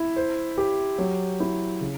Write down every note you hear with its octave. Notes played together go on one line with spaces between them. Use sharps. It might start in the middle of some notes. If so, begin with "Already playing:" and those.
Already playing: E4
C5
G4
F#3
E4
C#3